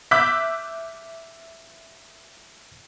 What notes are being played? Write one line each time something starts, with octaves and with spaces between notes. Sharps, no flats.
E5 D6 E6 F#6 G6 B6